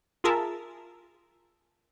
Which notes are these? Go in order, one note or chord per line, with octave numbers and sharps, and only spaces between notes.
F4 G#4 A#4 E5 A5